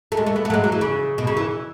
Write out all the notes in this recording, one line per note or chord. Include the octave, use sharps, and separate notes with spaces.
A3
G#3
A3
B3
A3
F#3
G#3
F#3
E3
C#3
B2
C#3
E3